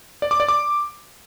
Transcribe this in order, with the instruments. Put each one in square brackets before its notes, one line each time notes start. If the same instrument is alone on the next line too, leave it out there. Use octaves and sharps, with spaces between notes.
[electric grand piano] D5
D6
D5
D6